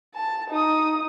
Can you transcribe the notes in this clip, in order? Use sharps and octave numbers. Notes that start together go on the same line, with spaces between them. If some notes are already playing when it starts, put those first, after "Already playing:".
A5
D#4 D#6